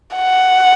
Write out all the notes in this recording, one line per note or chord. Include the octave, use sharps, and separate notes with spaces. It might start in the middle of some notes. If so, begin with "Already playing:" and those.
F#5